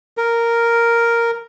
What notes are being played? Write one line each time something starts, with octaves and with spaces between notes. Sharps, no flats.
A#4